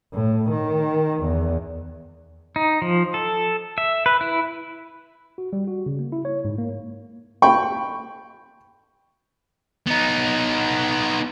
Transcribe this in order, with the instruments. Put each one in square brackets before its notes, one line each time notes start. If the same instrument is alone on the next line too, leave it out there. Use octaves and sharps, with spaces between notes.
[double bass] A2
D#3
E2
[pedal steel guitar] D#4
F3
A4
E5
B4
E4
[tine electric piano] F#4
G3
F#4
C#3
A#3
E4
C#5
G#2
A#3
[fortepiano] G5 B5 C#6
[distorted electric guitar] B3 D#4